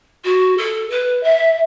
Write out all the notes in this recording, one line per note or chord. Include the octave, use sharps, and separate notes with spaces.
F#4
A4
B4
E5